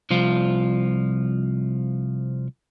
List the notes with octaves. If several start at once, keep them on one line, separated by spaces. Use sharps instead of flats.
C2 F3 F4